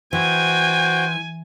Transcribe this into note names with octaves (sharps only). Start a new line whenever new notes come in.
E3 F#4 C5 G5 G#5